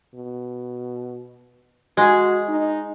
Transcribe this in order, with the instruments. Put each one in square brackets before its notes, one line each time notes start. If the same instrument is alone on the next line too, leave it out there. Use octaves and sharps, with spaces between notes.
[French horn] B2
[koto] G#3 G#4 [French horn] F#4
[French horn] D#4